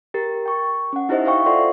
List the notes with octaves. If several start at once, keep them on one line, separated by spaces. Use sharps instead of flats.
G4 A#4 A6
G5 C#6
C#4 F#5
D#4 E4 G4 C5 D#5 E5
C5 D#5 F5 G5 C#6
F4 A4 D5 E5 F#5 C6